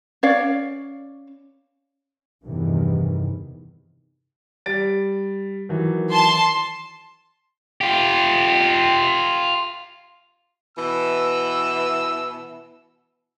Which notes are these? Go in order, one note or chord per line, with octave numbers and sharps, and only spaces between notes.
C#4 C#5 D5 F5
E2 G2 C3 D#3 E3
G3 A6 D7
D#3 E3 F#3
A5 C6
F4 G4
B2 E3 E6